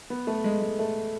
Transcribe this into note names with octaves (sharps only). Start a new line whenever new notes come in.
B3
A3
G#3
G#3
A3